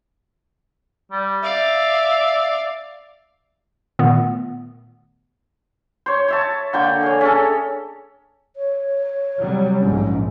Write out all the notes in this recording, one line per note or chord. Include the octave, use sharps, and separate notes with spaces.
G3
D5 E5 F5
A#2 D#3 A3 B3
C5 C#5
C#5 E5 A5
D3 A#3 G5 C#6
G#4 C#5
C#4 A4
C#5
C3 F#3 G3
A#1 G#2 C#4